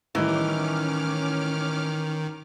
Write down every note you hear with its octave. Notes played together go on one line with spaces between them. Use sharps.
A2 D#3 E3 G3 C#4 D#4 D6 F6